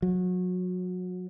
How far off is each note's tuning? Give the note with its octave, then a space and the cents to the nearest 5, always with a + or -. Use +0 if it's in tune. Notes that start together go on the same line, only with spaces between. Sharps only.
F#3 -30